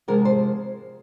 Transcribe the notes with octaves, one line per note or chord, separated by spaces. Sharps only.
C3 F3 G#3 A#4
C5